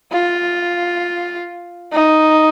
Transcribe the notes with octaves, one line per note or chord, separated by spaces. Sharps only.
F4
D#4